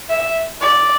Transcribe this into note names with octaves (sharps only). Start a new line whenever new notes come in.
E5
D5